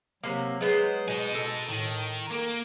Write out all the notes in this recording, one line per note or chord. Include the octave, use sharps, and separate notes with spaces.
C3 F#3 A#3
F#3 G#3 B3 C5
B2 D#4 G#4
A4
A2 D#3
A#3 A#4